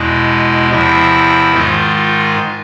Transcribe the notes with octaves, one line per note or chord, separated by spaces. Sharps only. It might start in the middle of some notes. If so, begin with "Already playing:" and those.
Already playing: E2 B2 G#3 E4
E2 C3 F3 E4
G#2 D#3 G#3 F4
F4